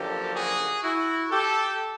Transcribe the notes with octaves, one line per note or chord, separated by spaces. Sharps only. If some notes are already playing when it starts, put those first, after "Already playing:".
Already playing: F#2 D3 F3 A#3 G4 A4
F#4 G#4
E4 F#4
G4 A4